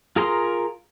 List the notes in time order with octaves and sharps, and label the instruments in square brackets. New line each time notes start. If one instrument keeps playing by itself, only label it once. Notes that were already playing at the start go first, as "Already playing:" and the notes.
[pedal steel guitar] F4 G#4 A#4 A#5 C6